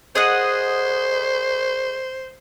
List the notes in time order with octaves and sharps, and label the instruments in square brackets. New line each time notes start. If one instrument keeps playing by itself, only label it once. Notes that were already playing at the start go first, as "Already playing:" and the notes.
[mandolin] G#4 D#5 F#5 [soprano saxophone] C5